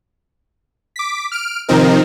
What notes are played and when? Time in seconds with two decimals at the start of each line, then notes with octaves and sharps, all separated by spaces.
0.96 D6 B6
1.32 F6 D7
1.68 C3 D#3 F3 C4 D#4 A#4